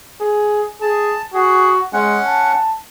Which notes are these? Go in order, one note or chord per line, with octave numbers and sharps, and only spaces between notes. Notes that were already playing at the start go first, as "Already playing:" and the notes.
G#4
G#4 A5
F#4 G#4
G#3 C#4 F#5
A5